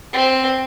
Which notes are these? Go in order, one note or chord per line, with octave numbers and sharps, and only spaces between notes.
C4